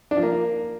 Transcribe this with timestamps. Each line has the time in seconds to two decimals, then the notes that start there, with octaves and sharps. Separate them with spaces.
0.11 D4
0.17 F3
0.23 A#3